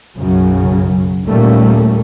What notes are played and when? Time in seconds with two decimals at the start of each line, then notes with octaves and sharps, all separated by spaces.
0.18 B1 F#2 C#3 F#3
1.27 D#2 A#2 G3 A3 A#3 C#4